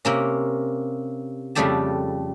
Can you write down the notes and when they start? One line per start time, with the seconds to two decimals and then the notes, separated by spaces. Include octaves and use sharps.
0.05 C3 A#3 C#4
1.55 F2 C#3 G3 A3 G4 A5